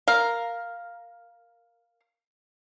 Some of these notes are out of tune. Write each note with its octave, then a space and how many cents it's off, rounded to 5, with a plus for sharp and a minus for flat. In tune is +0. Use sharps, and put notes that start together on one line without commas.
A#4 +0 F5 +0